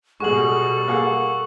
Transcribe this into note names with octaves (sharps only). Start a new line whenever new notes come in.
B2 G3 G#3 F#4 G#4 A4 C#6 F#7
A#3 G#4 F#5